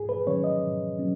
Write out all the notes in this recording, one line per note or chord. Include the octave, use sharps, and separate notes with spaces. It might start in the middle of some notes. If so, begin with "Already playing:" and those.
Already playing: G#2 G#4
B4
D#3 F#3 C#4 C#5
D#5
G#2
F#3 C#4